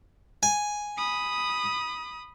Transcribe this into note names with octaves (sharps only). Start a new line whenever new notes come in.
G#5
B5 D#6